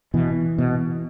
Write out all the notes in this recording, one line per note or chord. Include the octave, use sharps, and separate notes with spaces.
B2 E3
B2